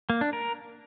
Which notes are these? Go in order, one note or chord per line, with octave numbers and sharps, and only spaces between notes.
A#3
D4
A#4